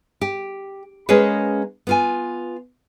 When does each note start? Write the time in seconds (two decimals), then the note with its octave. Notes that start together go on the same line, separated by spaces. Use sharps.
0.21 G4
1.09 G#3 A#3 C#4 G#4 B4 C#5
1.87 B3 F4 G#5